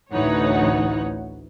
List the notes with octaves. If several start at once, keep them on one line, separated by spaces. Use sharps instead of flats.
A1 D2 E3 D#4 C#5 F#5